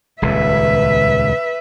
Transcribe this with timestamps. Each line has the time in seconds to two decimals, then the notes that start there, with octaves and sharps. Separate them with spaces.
0.22 D#1 C#2 B4 E5